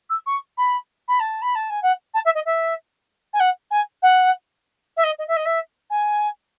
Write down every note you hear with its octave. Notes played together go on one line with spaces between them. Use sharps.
E6
C#6
B5
B5
A5
B5
A5
G#5
F#5
A5
E5
D#5
E5
G#5
F#5
G#5
F#5
E5
D#5
D#5
E5
D#5
E5
G#5